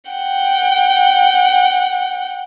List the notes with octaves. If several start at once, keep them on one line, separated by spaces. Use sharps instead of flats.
F#5 G5